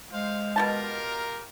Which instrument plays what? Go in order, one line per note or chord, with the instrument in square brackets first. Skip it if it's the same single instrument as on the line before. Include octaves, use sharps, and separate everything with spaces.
[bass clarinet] G#3 [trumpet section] C5 F5
[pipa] B2 D#4 A5 [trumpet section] F4 G4 A#4